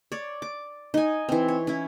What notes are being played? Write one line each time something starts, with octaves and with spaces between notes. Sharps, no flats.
C#5 D5
D6
D#4 G#5
E3 C4
C#5
C#4 E4